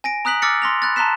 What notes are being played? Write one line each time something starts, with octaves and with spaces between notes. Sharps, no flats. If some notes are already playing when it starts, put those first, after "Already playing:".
G#5 A#6 D7
A#5 D#6 F#6 B6 F#7
D6 E6 F6 A6 A#6 C#7
C6 A#6 F7
B5 F#6 A6
A5 A#5 C6 F#6 B6 E7